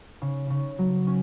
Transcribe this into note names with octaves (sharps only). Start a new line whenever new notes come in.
C#3
C#3
F#3
C#4